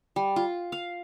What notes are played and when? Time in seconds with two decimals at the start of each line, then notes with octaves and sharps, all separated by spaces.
0.16 G3
0.36 F4
0.72 F5